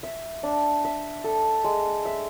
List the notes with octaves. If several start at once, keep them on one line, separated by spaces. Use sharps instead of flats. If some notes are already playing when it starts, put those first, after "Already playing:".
E5
D4
E5
A4
G#3
E5